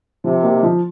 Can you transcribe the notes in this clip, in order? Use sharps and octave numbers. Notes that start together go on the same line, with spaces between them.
C3 F3
A#3 D#4 G4
F3